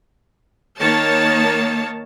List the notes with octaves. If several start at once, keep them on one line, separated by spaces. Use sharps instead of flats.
D#3 A#3 C#5 A5